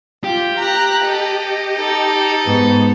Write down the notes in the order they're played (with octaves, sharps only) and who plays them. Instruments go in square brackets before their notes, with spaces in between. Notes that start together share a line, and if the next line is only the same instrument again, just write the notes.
[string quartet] F4 [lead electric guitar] G4
[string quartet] A#5 F#6
[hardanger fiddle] A4 [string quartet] D#5
[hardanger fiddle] D#4 A4
[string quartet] G#2 B3